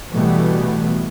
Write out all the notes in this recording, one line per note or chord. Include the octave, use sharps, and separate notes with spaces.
B2 E3 G3 A3 B3